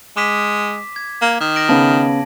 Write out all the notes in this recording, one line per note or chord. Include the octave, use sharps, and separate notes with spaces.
G#3 D6 B6 E7
G#6
A#3
D#3
A#6 D7 F#7
C#3 B3 A5